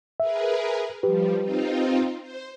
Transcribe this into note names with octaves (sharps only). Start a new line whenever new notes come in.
G#4 A#4 B4 E5
F3 G3 G4 B4
C4 D#4 F4
C5